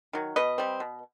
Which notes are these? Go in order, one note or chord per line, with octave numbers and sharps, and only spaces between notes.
D#3 F#3
B2 B4 D#5
G3 C4
B2